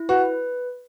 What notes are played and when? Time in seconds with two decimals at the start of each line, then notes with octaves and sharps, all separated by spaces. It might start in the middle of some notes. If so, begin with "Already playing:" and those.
Already playing: E4
0.09 F#4 B4